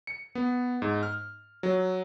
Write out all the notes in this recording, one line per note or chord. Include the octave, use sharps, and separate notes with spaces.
C#7
B3
G#2
F6
F#3